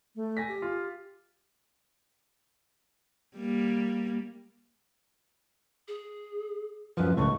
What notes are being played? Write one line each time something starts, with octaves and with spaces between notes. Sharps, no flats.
A3
G#5 A#6 B6
G4
F4
G3 A#3
G#4
F#2 F3 B4
C#2 A2 C#6